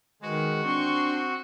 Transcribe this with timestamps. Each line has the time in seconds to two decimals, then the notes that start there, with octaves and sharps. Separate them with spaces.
0.22 D#3 G#3 F#4 B4
0.64 C4 D4 C6 C#6